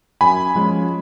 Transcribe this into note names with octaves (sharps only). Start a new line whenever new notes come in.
F#2 G#5 B5
F3 G#3 C#4 F4